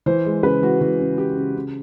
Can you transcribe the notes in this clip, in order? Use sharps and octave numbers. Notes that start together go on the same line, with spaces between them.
E3 C5
G#3
C#3 B4
E3 F#4
E3 F#4
C#3
C#3 G4
C#3
C#3